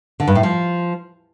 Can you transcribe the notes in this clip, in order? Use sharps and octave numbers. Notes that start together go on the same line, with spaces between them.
D3
G2
A2
F3